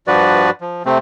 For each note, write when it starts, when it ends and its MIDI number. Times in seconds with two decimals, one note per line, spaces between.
0.07 0.50 43
0.07 0.50 53
0.07 0.50 66
0.07 0.50 71
0.07 0.50 74
0.61 0.83 53
0.85 0.98 48
0.85 0.98 57
0.85 0.98 60